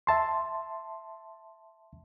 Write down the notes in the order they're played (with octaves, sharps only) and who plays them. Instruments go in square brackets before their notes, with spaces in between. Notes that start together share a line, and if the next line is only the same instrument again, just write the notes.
[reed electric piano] E5 A5 C6